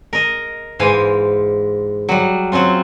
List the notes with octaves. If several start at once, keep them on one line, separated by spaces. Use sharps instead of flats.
A#4 D#5
G#2 E3 C5 F5 G#5
F#3 G3
F#3 C4 C#4 F4